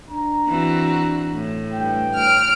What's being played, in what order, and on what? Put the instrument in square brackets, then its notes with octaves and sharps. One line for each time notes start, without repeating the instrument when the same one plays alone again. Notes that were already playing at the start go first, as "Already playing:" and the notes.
[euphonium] D4 [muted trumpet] A#5
[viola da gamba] E3 C4 F#4
A2
[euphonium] G2 [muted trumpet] G5
[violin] F6 D7